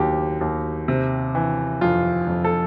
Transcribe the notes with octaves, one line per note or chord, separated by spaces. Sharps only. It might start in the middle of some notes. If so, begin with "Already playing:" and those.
Already playing: D#2 F#3 G4
D#2
C3
E3
F2 F4
F2
A4